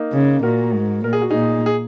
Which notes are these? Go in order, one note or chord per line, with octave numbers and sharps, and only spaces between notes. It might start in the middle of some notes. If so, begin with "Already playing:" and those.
Already playing: A#3 D#4
C#3
A#2 F#4 A#4
G#2
A#2 A#4
G#4
F#4
A#2 D#4 G#4
G#4